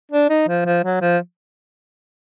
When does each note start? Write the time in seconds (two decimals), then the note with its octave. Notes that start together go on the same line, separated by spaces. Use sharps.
0.12 D4
0.30 D#4
0.48 F3
0.66 F3
0.84 F#3
1.01 F3